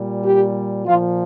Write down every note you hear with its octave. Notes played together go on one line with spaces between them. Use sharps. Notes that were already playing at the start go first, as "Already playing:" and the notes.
Already playing: A#2 G3
G4
A#2 F3 F4